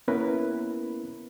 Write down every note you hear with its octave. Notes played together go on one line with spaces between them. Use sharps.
A#3 B3 C#4 E4 A#4 B4